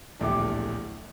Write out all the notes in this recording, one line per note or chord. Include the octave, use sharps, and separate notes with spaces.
D1 A#1 E2 A3 G4 D6